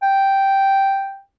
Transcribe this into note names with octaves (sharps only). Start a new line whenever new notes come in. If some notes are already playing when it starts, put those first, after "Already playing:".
G5